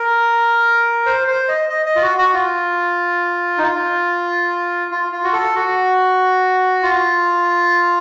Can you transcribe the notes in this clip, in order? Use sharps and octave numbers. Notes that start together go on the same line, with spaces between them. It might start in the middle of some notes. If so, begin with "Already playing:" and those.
Already playing: A#4
C5
C5
D#5
D#5
D#5
F4
F#4
F#4
F4
D#4
F4
F4
F4
F#4
A4
F#4
F4